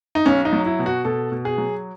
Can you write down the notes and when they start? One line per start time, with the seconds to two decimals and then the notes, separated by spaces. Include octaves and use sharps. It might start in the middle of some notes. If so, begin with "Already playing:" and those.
0.15 D#4
0.26 B1 C#4
0.45 D#4
0.53 F#3
0.66 E4
0.79 B2
0.86 F#4
1.05 B2 A4
1.32 B2
1.45 G#4
1.58 F#3